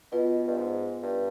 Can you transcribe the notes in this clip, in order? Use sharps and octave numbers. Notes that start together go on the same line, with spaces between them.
B2 B3 F4 B4 D#5
G2
G#2
G2